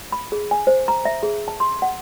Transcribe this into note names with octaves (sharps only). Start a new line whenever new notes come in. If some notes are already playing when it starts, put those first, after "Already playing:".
B5
G#4
G#5
C5
A#5
E5
G#4
A5
C6
F#5